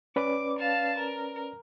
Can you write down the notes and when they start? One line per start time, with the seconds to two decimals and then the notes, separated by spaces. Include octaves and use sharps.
0.16 C#4 B4 D5 D6
0.59 F5 A5
0.98 A#4